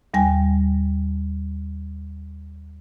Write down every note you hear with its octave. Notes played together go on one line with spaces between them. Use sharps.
D#2 G3 G5 G#5